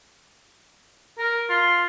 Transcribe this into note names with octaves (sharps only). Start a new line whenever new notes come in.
A#4
F4